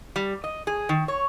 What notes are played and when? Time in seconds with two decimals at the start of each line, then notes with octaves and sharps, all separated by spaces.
0.16 G3
0.44 D#5
0.67 G#4
0.89 D#3
1.08 C#5